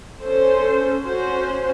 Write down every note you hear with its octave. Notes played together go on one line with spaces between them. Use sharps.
C#4 A4 C5
C#4 F#4 C5